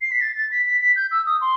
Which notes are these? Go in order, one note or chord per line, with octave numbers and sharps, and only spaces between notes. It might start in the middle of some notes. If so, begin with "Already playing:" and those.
C7
B6
A6
A6
B6
B6
B6
G6
E6
D#6
C6